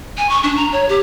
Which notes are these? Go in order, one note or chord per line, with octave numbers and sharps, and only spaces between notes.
G#5
C#6
D4
A#5
C#5
G4